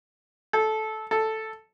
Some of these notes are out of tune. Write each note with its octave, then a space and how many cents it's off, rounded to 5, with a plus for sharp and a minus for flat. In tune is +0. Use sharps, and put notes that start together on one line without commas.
A4 -15
A4 +0